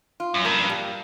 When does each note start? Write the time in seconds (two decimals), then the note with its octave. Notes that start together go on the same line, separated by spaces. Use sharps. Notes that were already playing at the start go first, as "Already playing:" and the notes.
0.20 F4
0.34 F#2
0.45 G2 A#3
0.69 G3